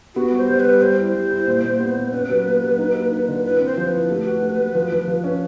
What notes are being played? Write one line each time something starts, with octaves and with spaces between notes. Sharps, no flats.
B3 F#4
G3
C5
G3
G3 B4
G3 C5
E4
C5
G3
E4
A#2
A#2
B3
A#2
C#4 B4
F#3
A#3
F#3
D#4
A#3
D#4
D3
E4 B4
C4
C5
F3
B4
E4
A3
F#4
A3
A3
F3
F3
F3
C#4